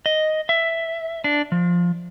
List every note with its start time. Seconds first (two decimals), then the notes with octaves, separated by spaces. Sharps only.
0.06 D#5
0.49 E5
1.24 D4
1.52 F3